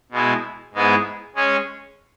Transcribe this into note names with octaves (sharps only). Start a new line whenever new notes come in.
B2 G#3 E4
G#2 G#3 B3 E4 G#4
G#3 C#4 G#4 C#5